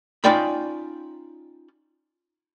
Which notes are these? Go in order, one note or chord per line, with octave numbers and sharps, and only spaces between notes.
C#4 D#4 F4 D5 G5 B5